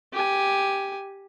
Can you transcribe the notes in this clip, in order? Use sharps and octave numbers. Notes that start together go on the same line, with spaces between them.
G4 G#5